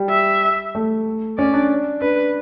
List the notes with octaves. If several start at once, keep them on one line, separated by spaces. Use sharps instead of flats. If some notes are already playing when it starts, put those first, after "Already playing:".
Already playing: G3
E5
A3
C#4 D5
D4
D4 B4